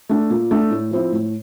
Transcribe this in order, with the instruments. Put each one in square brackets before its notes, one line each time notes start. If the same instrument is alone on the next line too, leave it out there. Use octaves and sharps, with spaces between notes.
[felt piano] A3 D4
A#2
A3 D4
A2
F3 C4 E4
A2